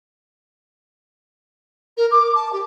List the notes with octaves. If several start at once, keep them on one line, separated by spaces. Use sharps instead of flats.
A#4
D6
A5
G4